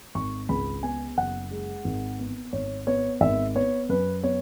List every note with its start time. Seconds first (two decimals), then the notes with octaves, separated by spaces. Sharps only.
0.15 G#1 C#6
0.49 C#2 B5
0.83 B3 G#5
1.17 F#1 F#5
1.51 G#3
1.85 G#1
2.19 B3
2.53 G#1 C#5
2.87 B3 C#5
3.21 G#1 E5
3.55 B3 C#5
3.89 F#2 B4
4.23 B3 C#5